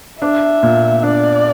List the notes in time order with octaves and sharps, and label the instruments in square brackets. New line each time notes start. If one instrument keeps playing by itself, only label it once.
[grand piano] D4 [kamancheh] E5
[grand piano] A#2
[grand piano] D4 [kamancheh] D5